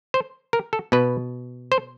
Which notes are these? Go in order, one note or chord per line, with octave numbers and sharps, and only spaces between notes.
C5
A#4
A4
B2 B4
C5